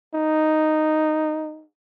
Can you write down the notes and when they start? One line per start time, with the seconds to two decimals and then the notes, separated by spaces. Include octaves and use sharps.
0.14 D#4